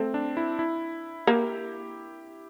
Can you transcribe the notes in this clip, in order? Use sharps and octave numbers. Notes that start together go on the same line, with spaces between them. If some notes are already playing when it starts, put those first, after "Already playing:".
Already playing: A3 C4
D4
E4
E4
A#3 G4